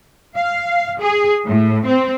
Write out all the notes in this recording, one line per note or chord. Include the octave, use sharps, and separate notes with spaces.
F5
G#4
A2
C4